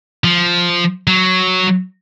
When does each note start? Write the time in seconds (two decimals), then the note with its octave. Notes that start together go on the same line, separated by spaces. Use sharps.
0.24 F3
1.07 F#3